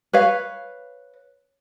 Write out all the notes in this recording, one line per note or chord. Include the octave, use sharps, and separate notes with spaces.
B4 C#5 F5